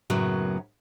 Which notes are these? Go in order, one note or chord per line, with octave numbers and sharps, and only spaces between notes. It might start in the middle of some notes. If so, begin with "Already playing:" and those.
F#2 A2 C#3 F#3 A#3 B3